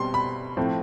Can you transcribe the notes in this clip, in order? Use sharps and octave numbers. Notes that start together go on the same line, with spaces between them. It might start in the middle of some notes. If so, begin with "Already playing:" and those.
Already playing: B2 G3 C4 C6
B5
A2 F3 A3 C4